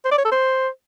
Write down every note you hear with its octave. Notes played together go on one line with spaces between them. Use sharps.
C5
D5
C#5
A4
C5